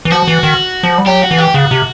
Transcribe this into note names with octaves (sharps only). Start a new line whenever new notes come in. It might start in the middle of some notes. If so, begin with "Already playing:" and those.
E3
F3 F#4
E3
D#3
F3
G3
F#3 G4
F#4
E3
G4
C#3 F#4
C3